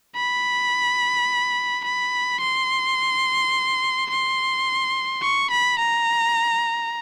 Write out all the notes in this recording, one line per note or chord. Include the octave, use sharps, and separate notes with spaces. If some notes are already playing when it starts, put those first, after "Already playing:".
B5
B5
C6
C6
C#6
B5
A#5